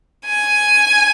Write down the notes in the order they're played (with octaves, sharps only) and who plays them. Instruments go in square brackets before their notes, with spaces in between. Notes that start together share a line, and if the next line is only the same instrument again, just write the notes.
[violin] G#5